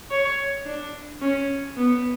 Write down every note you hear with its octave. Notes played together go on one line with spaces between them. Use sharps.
C#5
D4
C#4
B3